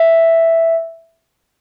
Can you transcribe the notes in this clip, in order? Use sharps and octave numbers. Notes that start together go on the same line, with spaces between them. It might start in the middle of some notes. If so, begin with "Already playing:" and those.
Already playing: E5